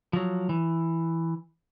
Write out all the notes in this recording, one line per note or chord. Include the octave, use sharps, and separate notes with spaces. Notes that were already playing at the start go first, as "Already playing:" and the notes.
F3 F#3
E3